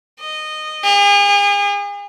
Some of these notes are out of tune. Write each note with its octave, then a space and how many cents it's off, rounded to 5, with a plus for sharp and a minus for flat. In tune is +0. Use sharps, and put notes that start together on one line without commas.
D#5 -15
G#4 -40